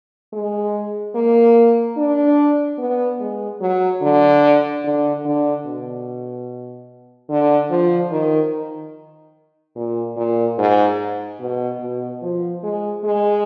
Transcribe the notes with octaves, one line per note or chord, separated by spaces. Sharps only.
G#3
A#3
D4
B3
G#3
F#3
D3
D3
D3
B2
D3
F3
D#3
A#2
A#2
G#2
B2
B2
F3
G#3
G#3